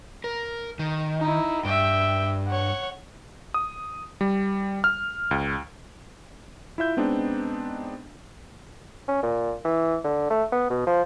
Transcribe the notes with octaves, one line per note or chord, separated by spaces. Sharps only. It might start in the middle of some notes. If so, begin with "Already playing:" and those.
A#4
D#3
D#4 E4
G2 E5 G5
C#5 F#5
D#6
G3
F6
C#2
E4 F4 E5 G6
G#3 B3 C4 D4 D#4
C#4
A#2
E3
D3
A3
B3
B2
F3